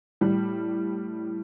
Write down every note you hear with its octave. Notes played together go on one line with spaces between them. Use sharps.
A2 G3